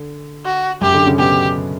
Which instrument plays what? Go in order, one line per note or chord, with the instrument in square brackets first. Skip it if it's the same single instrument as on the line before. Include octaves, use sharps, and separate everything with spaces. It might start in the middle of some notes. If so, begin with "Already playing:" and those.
Already playing: [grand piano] D3
[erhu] F#4
[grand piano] F#2 F#3 [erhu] G4
[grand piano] D3 D4
C#3 C#4
[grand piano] B2 B3 [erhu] G4